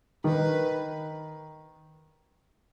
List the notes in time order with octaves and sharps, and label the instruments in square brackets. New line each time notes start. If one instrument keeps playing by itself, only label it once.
[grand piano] D#3 [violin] B4